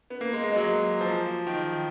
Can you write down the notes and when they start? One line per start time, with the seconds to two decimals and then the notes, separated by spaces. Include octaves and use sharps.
0.10 B3
0.21 A#3
0.33 G#3
0.44 G#3
0.56 F#3
1.01 F3
1.47 D#3